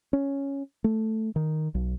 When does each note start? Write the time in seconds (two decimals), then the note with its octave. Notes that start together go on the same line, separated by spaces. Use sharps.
0.13 C#4
0.84 A3
1.36 D#3
1.75 B1